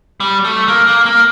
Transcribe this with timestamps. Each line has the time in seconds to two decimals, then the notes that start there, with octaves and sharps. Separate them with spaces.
0.20 G3
0.45 A3
0.68 A#3
0.87 A#3
1.06 A#3